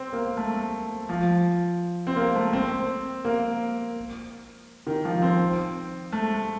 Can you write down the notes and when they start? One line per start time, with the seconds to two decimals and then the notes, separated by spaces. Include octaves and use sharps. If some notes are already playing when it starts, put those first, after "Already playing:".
Already playing: C4
0.13 A#3
0.37 A3
1.09 F3
2.07 C4
2.16 A#3
2.35 A3
2.53 C4
3.25 A#3
4.87 D#3
5.05 F3
5.22 C4
6.12 A3